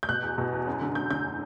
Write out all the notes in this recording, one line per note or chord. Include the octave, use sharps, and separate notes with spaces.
G6
B2 F#6
E2
B2
E2
F#2
D3
D3 G6
D3 G6